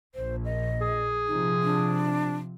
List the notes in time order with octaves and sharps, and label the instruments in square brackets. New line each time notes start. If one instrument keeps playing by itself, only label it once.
[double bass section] A#1 [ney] C5
[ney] D#5
[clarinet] G#4
[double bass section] C3 F3 [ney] D#4
[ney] D4